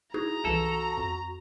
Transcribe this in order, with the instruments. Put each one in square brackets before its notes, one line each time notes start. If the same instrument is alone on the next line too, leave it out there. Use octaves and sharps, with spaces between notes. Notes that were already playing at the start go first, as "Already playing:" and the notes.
[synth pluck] D#4 F#4 G#4 [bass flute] E4 [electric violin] A#5
[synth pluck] C2 E3 [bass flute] F#4 [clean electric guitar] A4
[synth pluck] F2